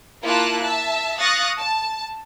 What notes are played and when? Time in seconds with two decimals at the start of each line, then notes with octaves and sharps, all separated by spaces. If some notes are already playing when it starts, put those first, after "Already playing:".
0.23 A#3 E4 F4 A5 F#6
0.62 E5 A5
1.20 F5 C#6 D#6 F#6 A6 A#6
1.58 A5